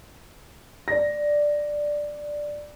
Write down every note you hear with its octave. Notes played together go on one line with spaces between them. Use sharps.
D5 A#6